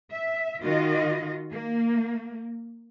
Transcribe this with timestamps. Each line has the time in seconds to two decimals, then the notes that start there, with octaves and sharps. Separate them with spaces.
0.12 E5
0.62 D#3 F4 F#4 D#5
1.51 A#3